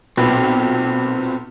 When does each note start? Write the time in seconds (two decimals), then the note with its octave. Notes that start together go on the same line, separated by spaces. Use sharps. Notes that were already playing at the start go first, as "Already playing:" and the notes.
0.17 B1 A#2 C4 B4